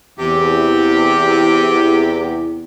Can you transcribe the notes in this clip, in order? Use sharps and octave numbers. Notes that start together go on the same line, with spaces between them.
E2 C3 G4